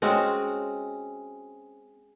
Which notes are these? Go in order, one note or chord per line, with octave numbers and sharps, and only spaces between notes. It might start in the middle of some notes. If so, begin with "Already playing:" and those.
G#3 C4 C#4 F#4